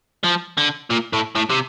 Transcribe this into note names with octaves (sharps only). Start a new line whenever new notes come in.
F3
D3
A#2
A2
A2
C3